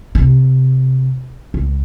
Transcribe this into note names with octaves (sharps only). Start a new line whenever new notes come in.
C3
C#2